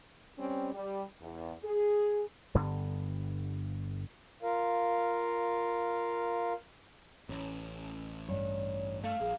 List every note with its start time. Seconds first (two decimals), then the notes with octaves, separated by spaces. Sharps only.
0.39 G3 C4 C#4
0.74 G3
1.21 E2
1.64 G#4
2.54 G1 G2 D3 B3
4.43 F4 A#4 F5
7.29 A1 C#4
8.28 G2 C#5
9.04 A3 F5
9.20 A#1 G#4